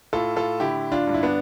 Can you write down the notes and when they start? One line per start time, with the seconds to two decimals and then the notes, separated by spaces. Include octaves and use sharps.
0.13 A2 F4 A4
0.36 F4 A4
0.60 D3 E4 G4
0.92 D4 F4
1.07 G2
1.14 E4
1.23 B3 D4